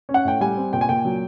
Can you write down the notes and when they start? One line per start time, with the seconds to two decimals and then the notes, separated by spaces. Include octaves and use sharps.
0.09 C#4
0.14 F#5
0.25 A2 G5
0.41 G3 G#5
0.57 C4
0.73 A#2 G5
0.81 G#5
0.89 A#2 G5
1.05 F#3